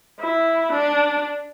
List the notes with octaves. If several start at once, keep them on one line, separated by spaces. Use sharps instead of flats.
E4
D4